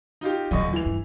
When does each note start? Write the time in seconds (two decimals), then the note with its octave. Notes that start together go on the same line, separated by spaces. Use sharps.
0.21 D#4 F4 G4
0.51 D#1 D3 F#3 D#5 C#6
0.73 E3 F7
0.86 G2